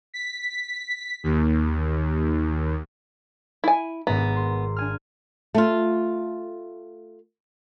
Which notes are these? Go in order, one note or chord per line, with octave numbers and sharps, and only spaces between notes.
B6
D#2
E4 G#5
G#1 G#2 B3 A#5
C6
D4 G#5 F6
A3 F4